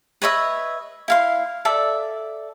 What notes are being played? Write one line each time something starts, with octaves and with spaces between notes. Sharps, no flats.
B4 C#5 D#5 E5
E4 F5 C6
A4 D5 E5